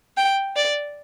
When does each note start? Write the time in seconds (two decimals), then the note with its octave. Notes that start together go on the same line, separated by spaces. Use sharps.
0.17 G5
0.56 D5